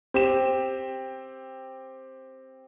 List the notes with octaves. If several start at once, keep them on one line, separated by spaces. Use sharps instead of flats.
C4 G4 E7